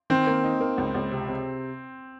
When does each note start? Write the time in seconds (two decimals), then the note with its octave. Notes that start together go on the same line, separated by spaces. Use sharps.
0.10 D#3 C4
0.27 A#3
0.44 D#4
0.60 A#3
0.78 C#2
0.95 C#2
1.11 C3
1.28 C3